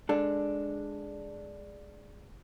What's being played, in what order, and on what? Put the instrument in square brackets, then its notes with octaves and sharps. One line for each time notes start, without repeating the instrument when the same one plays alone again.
[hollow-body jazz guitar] G#3 D4 A4